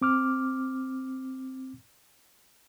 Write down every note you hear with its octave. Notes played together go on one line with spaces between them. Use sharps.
C4 D6 F6